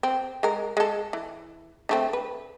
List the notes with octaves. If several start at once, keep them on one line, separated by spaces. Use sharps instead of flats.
C4
G#3 A#4
G#3 A4
E3
D3 A3 C4
B4